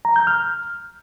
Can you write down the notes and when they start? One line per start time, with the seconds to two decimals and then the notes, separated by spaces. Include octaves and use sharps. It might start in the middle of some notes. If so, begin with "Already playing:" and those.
0.05 A#5
0.16 G6
0.27 F6